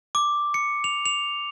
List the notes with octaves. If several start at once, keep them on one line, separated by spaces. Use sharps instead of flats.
D6
C#7
F7
F7